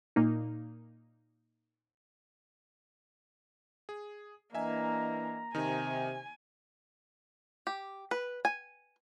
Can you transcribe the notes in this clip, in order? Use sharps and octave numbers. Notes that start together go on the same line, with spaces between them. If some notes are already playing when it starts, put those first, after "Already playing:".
A#2 A#3 D#4
G#4
E3 A#3 D4 D#5 E5 G#5 A#5
C3 D#3 D#4 G#5
G4
B4
G#5